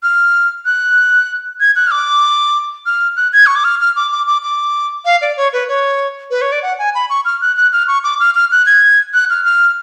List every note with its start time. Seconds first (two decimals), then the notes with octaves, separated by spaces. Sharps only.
0.03 F6
0.66 F#6
1.60 G#6
1.76 F#6
1.87 F6
1.91 D6
2.86 F6
3.17 F#6
3.33 G#6
3.46 C#6
3.56 D6
3.64 F6
3.80 F6
3.96 D6
4.12 D6
4.27 D6
4.43 D6
5.05 F5
5.21 D5
5.37 C#5
5.53 B4
5.68 C#5
6.31 B4
6.42 C#5
6.52 D5
6.63 F#5
6.79 G#5
6.95 B5
7.10 C#6
7.25 F6
7.41 F#6
7.57 F#6
7.73 F6
7.88 C#6
8.04 D6
8.20 F6
8.35 F6
8.52 F#6
8.66 G#6
9.14 F#6
9.30 F6
9.45 F6